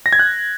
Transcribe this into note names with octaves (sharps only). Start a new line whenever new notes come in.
A#6
G#6
F#6